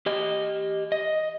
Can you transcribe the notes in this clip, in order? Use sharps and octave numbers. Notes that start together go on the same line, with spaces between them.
G4 D#5
D#5